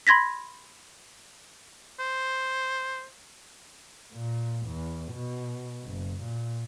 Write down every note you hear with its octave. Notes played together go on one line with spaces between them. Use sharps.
B5 C6 G#6 A#6 B6
C5
A#2
E2
B2
F#1
A#2